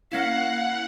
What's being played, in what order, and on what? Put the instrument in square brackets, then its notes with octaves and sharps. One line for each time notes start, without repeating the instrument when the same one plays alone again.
[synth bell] A#3 C#4 E4 [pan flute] F5 [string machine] F#5